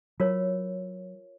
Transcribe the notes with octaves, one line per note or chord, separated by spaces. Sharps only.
F#3 F4 A#4 C#5